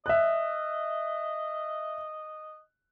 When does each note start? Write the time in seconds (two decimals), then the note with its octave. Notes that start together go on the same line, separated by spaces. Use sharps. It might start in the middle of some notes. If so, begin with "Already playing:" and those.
0.06 D#5 E5 F#6